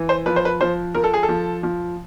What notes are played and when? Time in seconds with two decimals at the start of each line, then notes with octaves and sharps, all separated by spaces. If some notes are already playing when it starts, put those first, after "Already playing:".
Already playing: E3
0.09 C5
0.26 F3 B4
0.36 C5
0.45 B4
0.61 F3 C5
0.95 F3 A#4
1.04 A4
1.14 G#4
1.23 A4
1.29 F3
1.63 F3